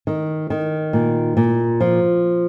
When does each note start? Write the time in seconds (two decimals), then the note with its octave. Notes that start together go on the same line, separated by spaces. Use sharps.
0.07 D#3
0.50 D#3
0.93 A#2
1.37 A#2
1.81 F3